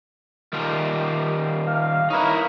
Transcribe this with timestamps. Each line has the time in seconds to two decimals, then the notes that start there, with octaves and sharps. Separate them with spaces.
0.53 D#3 G3 F4
1.67 F5
2.10 D#4 E4 A#4 B4 C#5